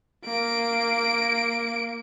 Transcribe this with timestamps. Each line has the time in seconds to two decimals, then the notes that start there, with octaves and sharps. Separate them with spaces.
0.24 A#3 D7